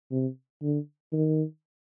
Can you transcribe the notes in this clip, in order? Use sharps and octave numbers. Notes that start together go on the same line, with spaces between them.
C3
D3
D#3